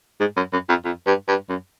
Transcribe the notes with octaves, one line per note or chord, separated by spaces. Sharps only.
G#2
F#2
F#2
F2
F2
G2
G2
F#2